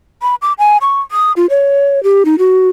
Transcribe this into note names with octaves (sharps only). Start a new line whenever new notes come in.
B5
D6
G#5
C#6
D#6
F4
C#5
G4
D#4
F#4